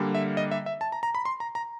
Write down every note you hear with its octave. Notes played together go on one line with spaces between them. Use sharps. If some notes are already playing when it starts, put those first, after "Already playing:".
Already playing: D3 G3 A#3
E5
D#5
E5
E5
A5
A#5
A#5
B5
C6
A#5
A#5